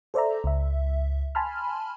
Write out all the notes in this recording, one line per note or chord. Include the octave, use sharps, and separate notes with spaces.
A4 C5 D5 E5 A#5
C#2 E5
G#5 A5 B5 C6 F6